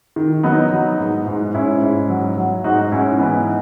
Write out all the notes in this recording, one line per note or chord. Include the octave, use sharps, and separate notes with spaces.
D#3
F#3 B3 D#4
F#3
G#2
G#2
G#2 C#4 E4
G#2
F#3
F#3
G#2 D#4 F#4
G#2 C#4 E4
E3 B3 D#4